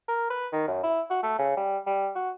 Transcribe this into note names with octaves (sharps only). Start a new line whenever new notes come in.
A#4
B4
D#3
F#2
E4
F#4
A3
C#3
G3
G3
F#4